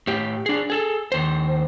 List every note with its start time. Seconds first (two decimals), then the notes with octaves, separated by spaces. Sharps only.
0.07 A2 G4
0.46 D4 G#4
0.70 G#4 A4
1.12 D#2 C5